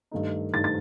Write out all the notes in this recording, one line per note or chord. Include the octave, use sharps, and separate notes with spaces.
G2 D#3 A3 D#4
G2 D#3 A3 D#4 A6
A6